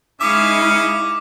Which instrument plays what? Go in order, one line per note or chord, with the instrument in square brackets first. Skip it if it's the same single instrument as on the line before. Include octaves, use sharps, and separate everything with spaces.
[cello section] G#3 D#4 E4 [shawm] C#4 [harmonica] F5 D#6 [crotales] D6